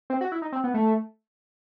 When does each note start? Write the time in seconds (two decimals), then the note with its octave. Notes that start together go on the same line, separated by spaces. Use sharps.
0.10 C4
0.21 F#4
0.32 E4
0.42 D#4
0.52 C4
0.64 B3
0.74 A3